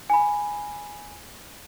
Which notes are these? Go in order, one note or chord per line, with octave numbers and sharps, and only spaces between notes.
G#5 B5